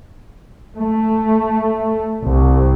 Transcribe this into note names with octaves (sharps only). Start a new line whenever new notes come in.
A3
C2